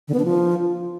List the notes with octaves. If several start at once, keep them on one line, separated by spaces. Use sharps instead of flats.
D3
B3
D4
F3